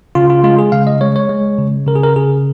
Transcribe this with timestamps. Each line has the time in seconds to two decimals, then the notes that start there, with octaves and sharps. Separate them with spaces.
0.15 C#3 F4
0.30 F4
0.44 G#3 F4
0.59 G#4
0.72 C#3 F5
0.87 D#5
1.01 G#3 C#5
1.16 C#5
1.30 G#3
1.59 C#3
1.87 C#3 A#4
1.95 G#4
2.04 A#4
2.16 C#3 G#4